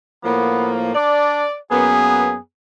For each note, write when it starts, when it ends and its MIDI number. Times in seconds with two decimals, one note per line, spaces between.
0.24 0.92 45
0.24 0.92 53
0.24 0.92 58
0.24 0.72 59
0.95 1.45 62
0.95 1.55 74
1.71 2.36 42
1.71 2.36 58
1.71 2.36 59
1.71 2.38 68